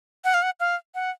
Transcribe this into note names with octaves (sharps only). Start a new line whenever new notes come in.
F#5
F5
F#5
F5
F#5